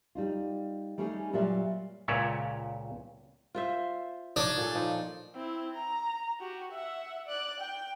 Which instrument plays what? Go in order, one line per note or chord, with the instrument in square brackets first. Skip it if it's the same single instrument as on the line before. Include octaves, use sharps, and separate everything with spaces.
[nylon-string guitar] G3 D#4 F4
G3 A3 C#4 D#4 F4 G#4
A#2 F#3 G3 F4 D5 E5
[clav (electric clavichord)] C#2 A#2 C#4 C#5 D5 E5
[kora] F4 C5 E5
[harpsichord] D4 [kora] D#4 C#5 D#5
[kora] A#2 A4
F3 D#4
[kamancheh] C4 E4
A#5
F#4 G4
E5 F#5
D5 F#6
G5